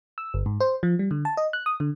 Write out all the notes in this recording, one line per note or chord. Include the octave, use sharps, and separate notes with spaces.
E6
G1
G#2
C5
F3
G3
D3
A5
D#5
F#6
D#6
D3